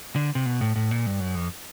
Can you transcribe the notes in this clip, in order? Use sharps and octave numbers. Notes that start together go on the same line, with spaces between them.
D3
C3
B2
A2
A2
A#2
G2
F#2
F2